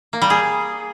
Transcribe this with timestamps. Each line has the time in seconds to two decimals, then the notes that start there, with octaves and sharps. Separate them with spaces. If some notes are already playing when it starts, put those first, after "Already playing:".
0.13 A#3
0.22 G3
0.30 G#4